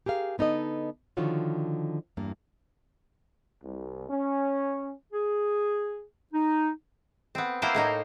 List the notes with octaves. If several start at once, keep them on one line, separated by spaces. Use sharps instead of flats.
G4 G#4 A#4 F5
D3 B3 D#4 A4 D#5
D3 D#3 F3 F4 F#4 C#5
E2 G2 A#3
C2
C#4
G#4
D#4
B3 C4
A#3 B3 E4 C5 F5 G5
A2 A#3 D#4